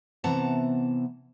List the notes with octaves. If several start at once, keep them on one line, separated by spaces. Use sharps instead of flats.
C3 E3 B3 F#5 A5 A#5